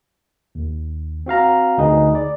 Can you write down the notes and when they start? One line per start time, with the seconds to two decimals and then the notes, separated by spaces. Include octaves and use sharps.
0.55 D#2
1.26 C4 F#4 F5 A#5
1.78 D2 D#4 G#4 B4 D#5
2.15 D5